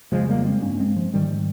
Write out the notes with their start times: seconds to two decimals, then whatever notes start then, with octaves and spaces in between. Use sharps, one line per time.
0.12 F2 C#3 F3 G#3
0.29 G3 A#3
0.45 G#3 C4
0.62 G2 A#3 C#4
0.79 G#3 C4
0.96 F3
1.14 G#2 D#3 G3